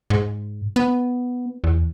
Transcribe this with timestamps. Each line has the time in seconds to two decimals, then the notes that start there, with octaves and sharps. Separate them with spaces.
0.10 G#2
0.76 B3
1.64 E2